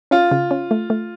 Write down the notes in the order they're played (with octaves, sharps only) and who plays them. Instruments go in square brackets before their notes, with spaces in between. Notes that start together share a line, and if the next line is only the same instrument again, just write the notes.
[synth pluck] C#4 [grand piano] F4
[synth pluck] C#3
C#4
A3
A3